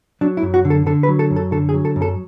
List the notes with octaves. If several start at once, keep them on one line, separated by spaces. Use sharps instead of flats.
F#3 D4
E4
F#2
F#4
D3
A4
D3 A4
B4
F#3
A4
F#2
A4
D3 A4
G#4
F#3
A4
F#2
A4